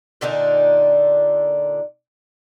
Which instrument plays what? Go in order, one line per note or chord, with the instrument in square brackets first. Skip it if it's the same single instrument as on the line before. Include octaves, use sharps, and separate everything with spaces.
[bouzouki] A#2 D3 D4 D#4